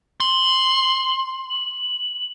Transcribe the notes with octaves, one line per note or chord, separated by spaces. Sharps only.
C6 F#7
F#7